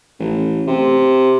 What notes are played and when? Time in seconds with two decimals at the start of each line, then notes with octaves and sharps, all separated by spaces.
0.19 A1
0.67 C3